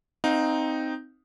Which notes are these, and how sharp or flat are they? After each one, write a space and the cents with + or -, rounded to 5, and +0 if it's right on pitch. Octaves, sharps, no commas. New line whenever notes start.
C4 +0 D#4 +0 F5 +25